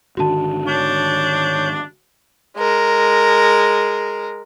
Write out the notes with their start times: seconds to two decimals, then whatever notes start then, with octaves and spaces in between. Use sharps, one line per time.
0.17 G#1 D3 D#3 F#4 A5
0.67 D4 C#5 G6
2.57 G#3 A#4